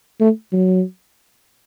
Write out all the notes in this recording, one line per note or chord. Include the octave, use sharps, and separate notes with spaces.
A3
F#3